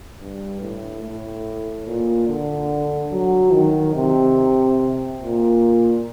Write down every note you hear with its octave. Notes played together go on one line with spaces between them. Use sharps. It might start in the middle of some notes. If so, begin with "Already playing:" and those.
G2
A2
A2
A#2
D3
F#3
D#3
C3
A#2